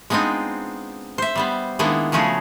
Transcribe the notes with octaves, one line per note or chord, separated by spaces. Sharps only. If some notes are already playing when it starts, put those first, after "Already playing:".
G#3 B3 C4 D4 D#4 F4
C5 E5
G3 B3 C5
D#3 G#3 A#3 B3 D4 E4
C#3 F3 A3 C#4 F#4 G#4